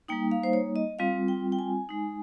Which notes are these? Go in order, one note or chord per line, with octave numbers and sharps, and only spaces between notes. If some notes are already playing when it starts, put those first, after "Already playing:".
G3 A#3 D#4 G5
F5
C5
C#5
D#5
G3 C4 F4 F5
G5
G5
G#5
G#3 D#4